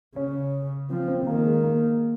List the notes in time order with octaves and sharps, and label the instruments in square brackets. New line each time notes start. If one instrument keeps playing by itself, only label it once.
[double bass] C#3 [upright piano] C#4
[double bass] F3 [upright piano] C4
[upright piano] C4
[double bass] D#3 [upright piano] A#3
[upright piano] G#3
A#3